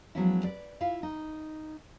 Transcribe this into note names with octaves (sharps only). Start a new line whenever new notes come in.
F3 F#3 G#3 B3 C#4 E4
B4 D5
E4 F4 F5
D#4